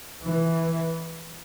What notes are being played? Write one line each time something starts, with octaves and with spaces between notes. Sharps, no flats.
E3